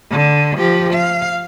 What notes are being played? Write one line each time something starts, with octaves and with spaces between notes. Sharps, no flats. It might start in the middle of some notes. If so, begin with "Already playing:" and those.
D3
F3 G4
F5